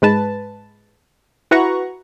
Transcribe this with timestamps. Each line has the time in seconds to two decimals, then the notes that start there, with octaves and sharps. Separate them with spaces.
0.02 G#2 G#3 B4 A5
1.51 E4 F#4 B4 F#5 A#5 C#6